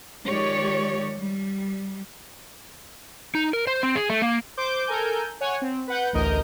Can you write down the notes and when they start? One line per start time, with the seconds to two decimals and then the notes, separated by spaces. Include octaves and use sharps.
0.25 D#3 F3 G#3 G4 C#5 D5
1.18 G3
3.35 D#4
3.53 A#4
3.67 C5
3.83 C4
3.96 G#4
4.10 A3
4.22 A#3
4.57 C5 D6 G6
4.86 A4 A#4 G#5 G6
5.41 C#5 F#5 G#5
5.62 C4
5.87 B4 F#5 G6
6.13 A1 D2 A#4 D#5 G6